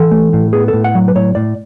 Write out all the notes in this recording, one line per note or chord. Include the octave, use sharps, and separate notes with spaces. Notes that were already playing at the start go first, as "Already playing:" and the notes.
Already playing: E3 A4
A3
A2
B3 G#4
A4
A2
F#5
F#3
B4
A2 C#5
A2 D5